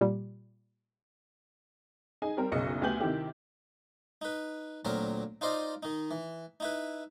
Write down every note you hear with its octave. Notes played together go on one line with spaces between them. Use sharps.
A#2 G3
D#4 G#4 G#5
G3 C4 A#4
F#1 B1 C#3 D#5 C#7
D2 B3 G4 G#5 G6 F#7
C3 D#3 E4 G4
D#4 B4
D2 A#2 F#3 C4 A#4
D#4 F4 C5 D5 D#5
D#3 D#4
E3
D#4 E4 B4